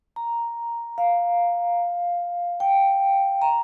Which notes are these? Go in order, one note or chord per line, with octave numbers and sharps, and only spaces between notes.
A#5
F5
G5
A#5